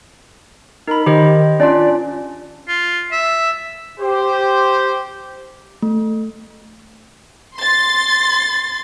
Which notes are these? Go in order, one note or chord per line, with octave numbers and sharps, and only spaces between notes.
D#4 A#4 B5
D#3 G4 C5 D#5
C#4 D4 F4 D5
F4
E5
G4 C5
A3
C6 A6